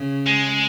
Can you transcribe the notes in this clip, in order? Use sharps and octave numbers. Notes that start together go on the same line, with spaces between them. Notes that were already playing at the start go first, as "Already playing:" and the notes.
Already playing: C#3
G#3